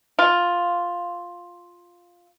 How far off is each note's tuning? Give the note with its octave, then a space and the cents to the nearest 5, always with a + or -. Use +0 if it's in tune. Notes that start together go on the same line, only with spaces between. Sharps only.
F4 +5